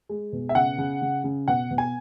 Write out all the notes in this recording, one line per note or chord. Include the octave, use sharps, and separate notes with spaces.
G#3
B2
E5
C#3 F#5
C#3
C#3
C#3
B2 F#5
B2
G#5